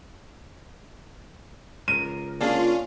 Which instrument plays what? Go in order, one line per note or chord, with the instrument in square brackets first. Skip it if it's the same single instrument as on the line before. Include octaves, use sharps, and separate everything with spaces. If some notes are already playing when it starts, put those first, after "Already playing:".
[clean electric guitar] C#2 A#4 [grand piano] D#7
[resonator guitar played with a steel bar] A#3 D4 G#4 [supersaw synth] C#4 F4